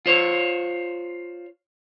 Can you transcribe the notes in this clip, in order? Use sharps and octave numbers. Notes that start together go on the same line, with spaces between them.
F4 C5 C#5